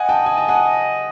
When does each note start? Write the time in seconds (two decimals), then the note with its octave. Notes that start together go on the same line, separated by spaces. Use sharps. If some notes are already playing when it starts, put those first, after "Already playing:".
Already playing: D#5 F#5 G#5
0.09 G5 A5
0.26 G#5
0.37 A5
0.48 F#5 G#5